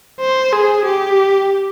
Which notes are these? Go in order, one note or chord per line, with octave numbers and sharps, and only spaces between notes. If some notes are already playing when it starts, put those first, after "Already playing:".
C5
G#4
G4